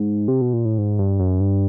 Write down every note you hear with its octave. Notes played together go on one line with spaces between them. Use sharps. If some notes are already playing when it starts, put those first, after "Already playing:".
Already playing: G#2
C3
B2
A#2
A2
G#2
G2
F#2
G2